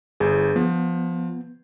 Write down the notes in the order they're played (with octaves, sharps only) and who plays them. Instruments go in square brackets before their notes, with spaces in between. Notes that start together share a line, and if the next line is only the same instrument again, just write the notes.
[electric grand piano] G1 G6 [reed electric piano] G#4
[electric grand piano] F3 [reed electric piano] B3